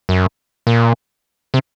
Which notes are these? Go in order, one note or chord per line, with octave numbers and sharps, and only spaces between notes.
F#2
A#2
C3